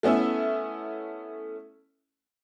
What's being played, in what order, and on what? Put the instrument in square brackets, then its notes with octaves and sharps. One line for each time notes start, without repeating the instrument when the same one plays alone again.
[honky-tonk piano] A3 B3 C#4 E4 E5